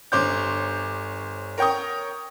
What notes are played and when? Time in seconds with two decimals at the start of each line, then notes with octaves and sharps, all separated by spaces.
0.12 G1 C5 C#5 D6 G6
1.58 A#4 C#5 G5 C#6 D#6